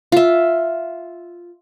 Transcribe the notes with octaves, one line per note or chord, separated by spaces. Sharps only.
F4 E5